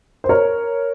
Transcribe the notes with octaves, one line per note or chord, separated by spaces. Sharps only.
C5
A#4 C#5